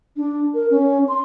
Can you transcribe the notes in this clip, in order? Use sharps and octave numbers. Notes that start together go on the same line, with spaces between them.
D4
A#4
C#4
C6